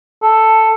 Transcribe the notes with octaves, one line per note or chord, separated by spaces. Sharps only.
A4